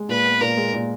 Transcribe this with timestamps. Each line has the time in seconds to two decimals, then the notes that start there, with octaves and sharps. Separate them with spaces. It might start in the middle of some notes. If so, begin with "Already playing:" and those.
Already playing: G#3
0.09 A#2 B4
0.26 B3
0.41 A#2 A#4
0.57 G#3
0.74 A#2